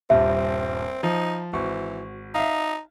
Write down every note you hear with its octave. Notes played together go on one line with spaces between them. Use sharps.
D#1 G2 C4 E5
F3 D#4
G#1 E3 F#4 C#6
D#4 E5 F5